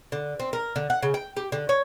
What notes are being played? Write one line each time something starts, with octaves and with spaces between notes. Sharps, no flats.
D3
C4
A#4
D3
F#5
C#3
G5
G4
D3
C#5